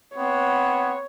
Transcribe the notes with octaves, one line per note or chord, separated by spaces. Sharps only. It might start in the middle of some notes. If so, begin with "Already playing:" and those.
B3 C4 C#5